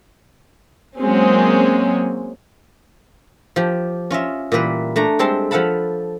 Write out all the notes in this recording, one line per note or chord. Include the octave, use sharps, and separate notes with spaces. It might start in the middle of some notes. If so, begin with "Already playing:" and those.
F#3 G#3 A#3 C4 C#4
F3 G4
C#4 F4 D#5 E5
A#2 E3 G3 A#3 B4
A3 D4 A#5
G3 G#3 C4 A4 A5 C6
F3 A4 F5 F#5 A5 B5